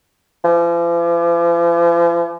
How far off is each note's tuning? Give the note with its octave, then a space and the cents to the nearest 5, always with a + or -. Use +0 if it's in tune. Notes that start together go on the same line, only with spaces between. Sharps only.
F3 -45